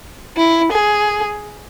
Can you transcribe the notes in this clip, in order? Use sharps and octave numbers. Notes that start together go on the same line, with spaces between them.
E4
G#4